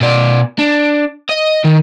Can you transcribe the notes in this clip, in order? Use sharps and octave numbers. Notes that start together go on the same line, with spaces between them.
B2 D5
D4
D#5
D#3